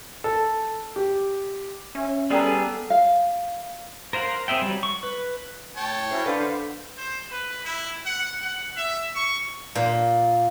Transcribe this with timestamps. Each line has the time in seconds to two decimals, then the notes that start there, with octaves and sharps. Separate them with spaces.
0.24 A4
0.96 G4
1.95 C#4 E5
2.30 G3 B3 G#4 A4 D5 G5 A#5
2.90 F5
4.13 A#4 C5 F5 F#5
4.48 C4 G#4 E5 G5
4.62 F#3 G3
4.83 C#6
5.03 B4
5.77 A2 C#5 G5 A5
6.11 C#4 E4 F#4 C5
6.26 D3 B4 C5 F5 F#5
6.97 C5
7.31 B4
7.66 E4
8.06 F#5
8.42 F#5
8.77 E5
9.16 C#6
9.75 A#2